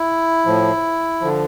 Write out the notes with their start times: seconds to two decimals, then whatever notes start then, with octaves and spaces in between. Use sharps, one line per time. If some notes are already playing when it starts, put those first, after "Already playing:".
Already playing: E4
0.45 A2 F3
1.21 D3 F3